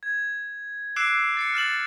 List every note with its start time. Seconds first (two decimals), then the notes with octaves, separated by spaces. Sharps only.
0.03 G#6
0.96 D6 E6 F#6 C7 D7 E7
1.37 A6 C7 C#7
1.54 F6 A6 E7 F#7